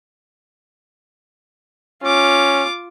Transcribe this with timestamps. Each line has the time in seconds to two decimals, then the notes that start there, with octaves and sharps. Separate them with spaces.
2.03 C#4 F4 D6